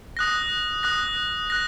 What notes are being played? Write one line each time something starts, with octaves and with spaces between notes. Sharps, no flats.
D#6 F#6 A#6
D#6 F#6 A#6
F#6 A#6